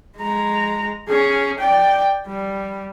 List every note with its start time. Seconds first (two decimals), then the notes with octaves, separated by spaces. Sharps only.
0.18 G#3 A#5
1.09 C#4 G#4
1.59 D5 G5
2.27 G3